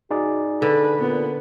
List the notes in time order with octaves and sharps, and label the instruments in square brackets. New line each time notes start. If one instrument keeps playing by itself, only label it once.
[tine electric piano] D#4 G#4 D5 [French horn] F#4
[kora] D3 [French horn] A4 [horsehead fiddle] B4
[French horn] A#2 [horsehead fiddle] B3